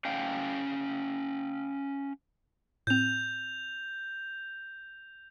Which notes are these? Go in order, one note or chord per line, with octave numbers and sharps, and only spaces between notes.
C#4 F5 G5
A2 C4 G6 F7